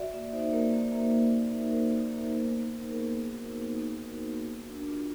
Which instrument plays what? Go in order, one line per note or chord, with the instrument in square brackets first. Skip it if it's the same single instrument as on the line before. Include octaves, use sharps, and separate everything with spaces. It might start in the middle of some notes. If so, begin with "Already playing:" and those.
Already playing: [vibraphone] F#4 D5 E5
A#3 D5 E5
D#4 C5 D5
A#3 A#4 C5
A#3
A#3
A#3
D#4
D#4
D#4 A#4 C5
D#4
A#3
B3
D#4
D#4
B3 G#4 A#4
B3
F#4
B3
D#4
D#4
F#4
F#4
F#4
D4
F4